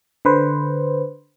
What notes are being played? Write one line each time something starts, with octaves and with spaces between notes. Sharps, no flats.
D3 B4 C5